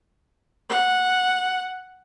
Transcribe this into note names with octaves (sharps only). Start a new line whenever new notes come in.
F#5